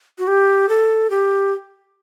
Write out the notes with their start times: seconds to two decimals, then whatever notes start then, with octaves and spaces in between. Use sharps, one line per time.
0.19 F#4
0.27 G4
0.69 A4
1.10 G4